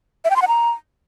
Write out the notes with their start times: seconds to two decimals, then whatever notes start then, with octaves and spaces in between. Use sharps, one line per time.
0.25 E5
0.30 G5
0.36 C6
0.42 F#5
0.48 A#5